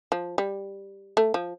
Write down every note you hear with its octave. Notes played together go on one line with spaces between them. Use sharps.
F3
G3
A3
F3